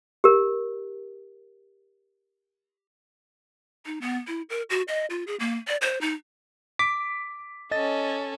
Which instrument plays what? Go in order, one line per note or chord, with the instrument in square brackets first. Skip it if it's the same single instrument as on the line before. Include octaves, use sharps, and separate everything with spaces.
[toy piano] G4 A#4
[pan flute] D#4
B3
E4
A#4
F#4
D#5
F4
G#4
A#3
D5
C5
D#4
[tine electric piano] D6 [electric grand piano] B6 D7
[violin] C#4 A4 [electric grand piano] D#5 A6